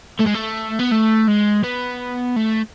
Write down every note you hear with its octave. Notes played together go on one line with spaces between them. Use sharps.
A3
G#3
A3
B3
A3
G#3
B3
A3